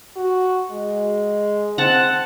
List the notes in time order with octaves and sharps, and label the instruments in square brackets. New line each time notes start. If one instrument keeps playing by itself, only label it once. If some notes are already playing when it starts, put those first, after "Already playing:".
[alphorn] F#4
G#3
[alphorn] C4 [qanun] F#5 A5